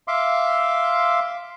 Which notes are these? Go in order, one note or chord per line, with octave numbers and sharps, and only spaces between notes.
E5 F5 C6 D6